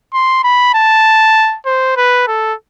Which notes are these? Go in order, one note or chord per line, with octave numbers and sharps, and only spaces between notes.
C6
B5
A5
C5
B4
A4